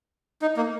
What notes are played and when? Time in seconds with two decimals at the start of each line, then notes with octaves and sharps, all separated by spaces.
0.42 D#4
0.57 A#3